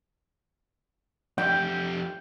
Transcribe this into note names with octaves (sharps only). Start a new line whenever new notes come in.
F2 G4 G5